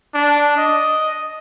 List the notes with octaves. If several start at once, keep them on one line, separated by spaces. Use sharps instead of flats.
D4
D#5